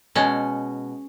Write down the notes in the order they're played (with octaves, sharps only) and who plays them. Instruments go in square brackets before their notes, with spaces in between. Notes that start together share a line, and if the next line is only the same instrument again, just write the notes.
[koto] B2 G#3 C#4